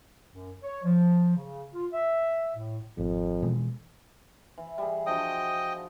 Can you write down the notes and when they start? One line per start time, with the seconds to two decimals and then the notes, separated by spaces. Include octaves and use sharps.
0.31 F#2
0.63 C#5
0.84 F3
1.36 C#3
1.73 F4
1.93 E5
2.55 A2
2.98 G#1 F2
3.42 B2 E3 G#3
4.58 E3
4.78 G3 G#4
5.06 F3 D4 F#4 D#5 G5 D#6